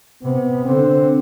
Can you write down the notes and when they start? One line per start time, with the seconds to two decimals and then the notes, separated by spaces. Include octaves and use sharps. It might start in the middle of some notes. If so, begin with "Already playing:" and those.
0.23 C3 B3
0.65 D3 C4